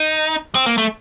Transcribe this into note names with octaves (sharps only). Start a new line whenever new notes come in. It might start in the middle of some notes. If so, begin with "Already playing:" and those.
Already playing: D#4
C4
A#3
A3